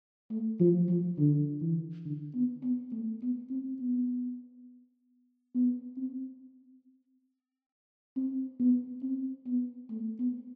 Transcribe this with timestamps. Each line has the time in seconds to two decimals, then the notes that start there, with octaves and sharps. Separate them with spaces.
0.31 A3
0.60 F3
0.89 F3
1.18 D3
1.61 E3
2.05 D3
2.35 B3
2.63 B3
2.92 A3
3.22 B3
3.51 C4
3.80 B3
5.55 B3
5.97 C4
8.16 C4
8.60 B3
9.02 C4
9.47 B3
9.91 A3
10.19 B3